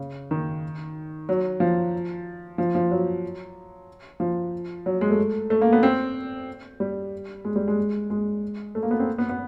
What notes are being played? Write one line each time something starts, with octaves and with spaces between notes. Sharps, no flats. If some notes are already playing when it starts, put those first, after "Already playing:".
Already playing: C#3
D#3
F#3
F3
F3
F3
F#3
F3
F#3
G#3
A3
A3
A#3
B3
C4
G3
G#3
G3
G#3
G#3
A3
A#3
B3
C4
B3
B3